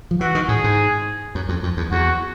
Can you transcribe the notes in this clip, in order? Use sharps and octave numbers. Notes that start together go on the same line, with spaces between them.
F3
E3 F#4
D#3
A2 G#4
G#2
F#2
F2
F2
E2
E2 F#4